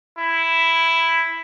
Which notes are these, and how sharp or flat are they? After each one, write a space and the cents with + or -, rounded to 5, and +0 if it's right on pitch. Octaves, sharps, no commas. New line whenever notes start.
E4 +0